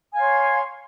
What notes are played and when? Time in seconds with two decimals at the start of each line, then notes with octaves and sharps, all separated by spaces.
0.11 G#5
0.14 F5
0.18 C#5
0.21 C6